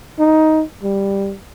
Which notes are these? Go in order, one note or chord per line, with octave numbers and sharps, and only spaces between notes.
D#4
G3